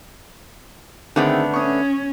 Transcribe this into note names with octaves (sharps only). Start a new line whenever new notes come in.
D3 D#3 A3 B3 C4 G#4
C#4 C#6 D#6